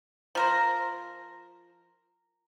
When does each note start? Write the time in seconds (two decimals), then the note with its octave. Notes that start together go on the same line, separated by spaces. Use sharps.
0.35 F3 A#4 C5